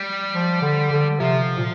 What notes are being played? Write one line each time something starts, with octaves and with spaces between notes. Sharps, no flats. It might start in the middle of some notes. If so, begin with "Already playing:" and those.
Already playing: G3
F3
D3
D3
C3 F3
A#2